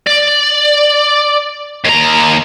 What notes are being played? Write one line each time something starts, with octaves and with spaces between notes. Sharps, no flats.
D5
D#2 A#5